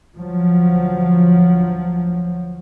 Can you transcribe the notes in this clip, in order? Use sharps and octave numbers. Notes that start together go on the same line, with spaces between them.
D2 F3 F#3